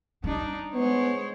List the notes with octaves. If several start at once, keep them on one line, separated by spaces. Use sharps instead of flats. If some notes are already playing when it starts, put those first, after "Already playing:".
G3 D4 D#4
G#3 B3 C5 C#5